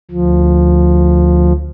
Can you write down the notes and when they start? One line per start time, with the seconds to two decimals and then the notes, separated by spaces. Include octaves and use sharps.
0.11 D2 F3